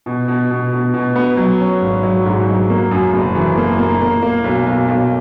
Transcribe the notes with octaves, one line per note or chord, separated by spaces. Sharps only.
B2
B2
B2
B2
B2
B3
F#3
C#4
G#1
F#3
G#2
F#3
A#3
F#2
F#1
E3
A#3
A#3
A#3
A#3
B1
B1
B1